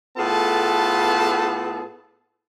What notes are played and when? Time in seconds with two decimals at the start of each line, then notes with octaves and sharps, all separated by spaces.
0.18 A2 B3 F4 G#4 A4 A5